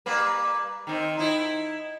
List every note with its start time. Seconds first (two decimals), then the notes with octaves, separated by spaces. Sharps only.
0.06 G3 A#3 B4
0.87 D#3 C4
1.17 D#4 E4